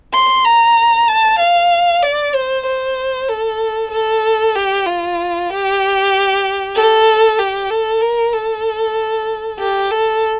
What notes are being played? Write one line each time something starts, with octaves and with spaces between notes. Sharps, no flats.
C6
A#5
A5
F5
D5
C5
C5
A4
A4
G4
F4
G4
A4
G4
A4
A#4
A4
G4
A4